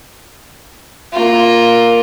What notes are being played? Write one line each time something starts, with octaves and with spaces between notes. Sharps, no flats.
A#3 F4